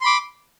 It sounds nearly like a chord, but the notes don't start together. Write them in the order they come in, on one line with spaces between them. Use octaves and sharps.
C6 B5 D6